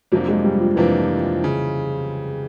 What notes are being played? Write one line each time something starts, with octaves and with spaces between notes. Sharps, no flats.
F2 C3 F3 F#3 A#3 D4
G#3
G3
F3
F2 C3 E3 F3 A#3 D4
C#3